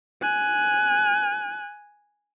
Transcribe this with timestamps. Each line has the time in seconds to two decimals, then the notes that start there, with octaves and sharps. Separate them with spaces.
0.22 G#5 F#6